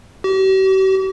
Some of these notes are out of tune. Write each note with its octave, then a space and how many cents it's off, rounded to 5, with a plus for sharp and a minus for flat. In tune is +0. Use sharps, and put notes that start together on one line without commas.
G4 -45